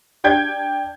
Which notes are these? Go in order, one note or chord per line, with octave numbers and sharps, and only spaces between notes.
D4 G5 G6 G#6